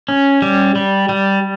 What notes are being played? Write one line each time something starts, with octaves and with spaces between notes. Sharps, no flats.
C#4
G3
G3
G3